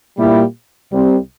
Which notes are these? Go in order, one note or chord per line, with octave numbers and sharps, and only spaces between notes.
A#2 G3 A#3 E4 G4
C2 C3 G3 C4